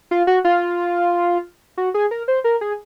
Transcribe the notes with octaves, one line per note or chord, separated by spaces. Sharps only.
F4
F#4
F4
F#4
G#4
A#4
C5
A#4
G#4